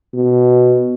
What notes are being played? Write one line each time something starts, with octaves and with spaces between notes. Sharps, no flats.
B2